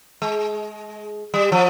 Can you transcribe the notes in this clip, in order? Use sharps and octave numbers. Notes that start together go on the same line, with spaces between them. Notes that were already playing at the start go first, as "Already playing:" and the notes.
G#3
G3
F3